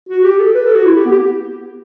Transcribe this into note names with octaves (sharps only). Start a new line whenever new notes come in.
F#4
G4
A4
B4
A4
F#4
E4
G4
B3
G4